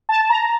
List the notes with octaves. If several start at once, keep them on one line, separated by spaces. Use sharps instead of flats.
A5
A#5